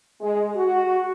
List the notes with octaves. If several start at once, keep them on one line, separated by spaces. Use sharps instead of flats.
G#3
F#4